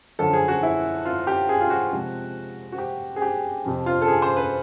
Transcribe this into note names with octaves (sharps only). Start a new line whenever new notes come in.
F#2 D3 F3 A4
G#4
F#4
E4
F4
G4
G#4
F4
F#4
C3 F3 G#3 C4
F#4
G4
G#4
G4
F2 C3 F3
F4
A4
G#4
C5
B4